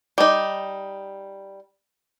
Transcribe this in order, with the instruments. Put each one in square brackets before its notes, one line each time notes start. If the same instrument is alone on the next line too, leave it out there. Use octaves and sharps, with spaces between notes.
[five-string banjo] G3 D#4